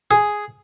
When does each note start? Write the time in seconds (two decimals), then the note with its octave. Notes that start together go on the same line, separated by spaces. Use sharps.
0.11 G#4